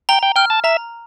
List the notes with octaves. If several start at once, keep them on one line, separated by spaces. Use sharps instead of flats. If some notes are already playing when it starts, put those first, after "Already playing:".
G5 A#5
G5
G5 F6
A5
E5 A#5